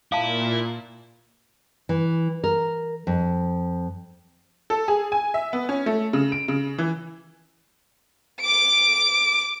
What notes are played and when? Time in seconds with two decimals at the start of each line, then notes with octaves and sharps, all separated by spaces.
0.12 A#2 E4 F5 A5
1.89 E3
2.44 A#4
3.07 F2
4.70 A4
4.88 G#4
5.12 G#5
5.34 E5
5.53 B3
5.69 C#4
5.86 A3
6.13 C#3
6.32 D7
6.48 C#3
6.78 E3
8.41 D6 D7